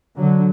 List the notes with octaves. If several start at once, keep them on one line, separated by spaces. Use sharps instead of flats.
D3 F#3